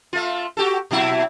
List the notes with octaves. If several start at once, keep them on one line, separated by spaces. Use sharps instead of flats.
A3 F4
F#4 G4 A4
B2 F#3 E4